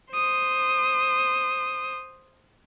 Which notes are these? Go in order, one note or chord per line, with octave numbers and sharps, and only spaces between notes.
C5 D#6